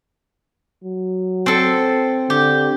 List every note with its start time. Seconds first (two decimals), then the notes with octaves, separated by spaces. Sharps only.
0.84 F#3
1.46 C4 A4
2.30 D3 G4